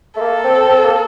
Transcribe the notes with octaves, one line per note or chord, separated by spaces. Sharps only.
A3
A#3 A4
C4
C4
A#3